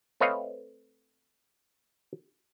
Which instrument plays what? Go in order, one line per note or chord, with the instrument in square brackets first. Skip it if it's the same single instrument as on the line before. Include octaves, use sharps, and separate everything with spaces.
[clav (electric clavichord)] A3 C4 B4 C#5 D#5 F5